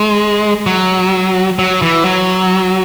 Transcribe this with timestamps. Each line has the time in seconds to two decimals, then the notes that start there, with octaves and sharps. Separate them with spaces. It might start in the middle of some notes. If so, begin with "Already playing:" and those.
Already playing: G#3
0.66 F#3
1.59 F#3
1.82 E3
2.05 F#3